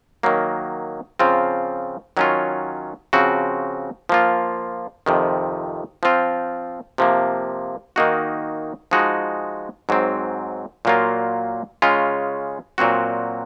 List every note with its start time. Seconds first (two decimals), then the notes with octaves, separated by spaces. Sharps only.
0.23 D#3 F#3 A#3
1.19 C#3 F3 C4 F4
2.17 D#3 F#3 C#4 F4
3.13 C#3 F3 C4 F#4
4.09 F3 A#3 F4
5.06 F2 C3 D#3
6.03 F3 C4 F4
6.98 C3 F3 A#3
7.96 D#3 A#3 D#4 F#4
8.91 F3 G#3 D#4 F#4
9.89 G#2 F#3 C4
10.85 A#2 F#3 A#3 F4
11.82 C#3 G#3 C#4 F4
12.78 A#2 F#3 C4 F#4